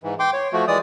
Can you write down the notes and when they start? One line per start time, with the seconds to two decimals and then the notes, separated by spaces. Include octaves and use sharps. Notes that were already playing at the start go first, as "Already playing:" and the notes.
0.04 G#2 E3
0.19 G5 C6 D6
0.33 C#5
0.53 F3 A3 F#4
0.68 E3 G#3 D5 D#6